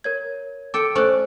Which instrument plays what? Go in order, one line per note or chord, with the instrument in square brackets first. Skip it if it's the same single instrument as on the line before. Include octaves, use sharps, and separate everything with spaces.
[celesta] A#4 C#5 G#6
[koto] A4 G5 [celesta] D6 C#7 D7
[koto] A3 C#4 D5 [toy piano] C5 [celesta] C#6 F#6